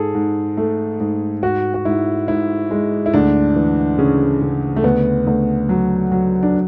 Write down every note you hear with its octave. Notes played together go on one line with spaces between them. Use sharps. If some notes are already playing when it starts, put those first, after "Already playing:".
Already playing: G#2 G#4 A4
G#2
A3
G#2
G#2 F#4
F#4
G#2 E4
G#2 E4
G#3
E4
D2 D4
E3
C#3 C#4
C#3
A3
D2 B3
D2
F#3
F#3
D4